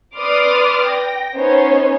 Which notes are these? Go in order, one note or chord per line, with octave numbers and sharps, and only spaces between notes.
B4 D5 C6 D6 D#6 F6
G5 A#6
B3 C#4 D#4 C5 C#5